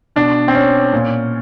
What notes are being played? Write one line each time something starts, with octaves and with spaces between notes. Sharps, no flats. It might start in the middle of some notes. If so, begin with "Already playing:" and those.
B2 D4
C4
C#4
A#2